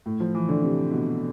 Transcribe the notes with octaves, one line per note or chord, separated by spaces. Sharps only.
A2
F3
E3
D3
C3
B2